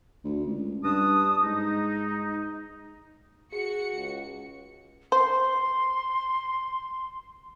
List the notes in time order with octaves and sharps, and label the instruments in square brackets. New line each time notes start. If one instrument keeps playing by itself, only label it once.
[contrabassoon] D2
C#2
[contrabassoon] G2 [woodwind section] B4 A5 D#6
[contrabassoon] G#2 [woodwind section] D#4
[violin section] F#4 C#7 [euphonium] G#4
[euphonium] C#2
[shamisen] C5 [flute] C6